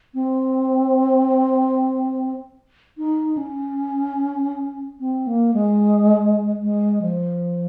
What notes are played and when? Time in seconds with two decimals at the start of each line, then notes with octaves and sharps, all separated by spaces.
0.14 C4
2.98 D#4
3.37 C#4
5.00 C4
5.27 A#3
5.54 G#3
6.62 G#3
7.02 F3